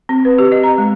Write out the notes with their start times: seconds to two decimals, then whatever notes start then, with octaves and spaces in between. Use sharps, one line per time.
0.09 C4
0.25 B4
0.38 G4
0.52 D#5
0.63 A#5
0.78 G#3